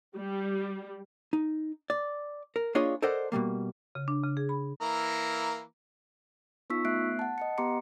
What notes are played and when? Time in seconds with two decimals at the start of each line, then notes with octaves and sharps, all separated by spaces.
0.16 G3
1.33 D#4
1.90 D5
2.56 A#4
2.75 A#3 D4 F4 G#4 C#5 D#5
3.02 A4 A#4 C5 D5 D#5 F#5
3.32 B2 F3 G3 A#3
3.95 C#3
4.08 D4
4.23 C#3
4.37 G#4
4.49 B5
4.81 E3 A#3 A#5
6.70 B3 D#4 F4 C#6 E6 B6
6.85 A3 B3 E5 F#6 C7 D7
7.19 F#5 A5
7.38 D#5 F#5 C#7
7.58 B3 G4 A#5 C6 D6 C#7